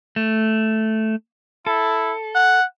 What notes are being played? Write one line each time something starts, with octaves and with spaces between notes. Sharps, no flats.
A3
E4 A4
F#5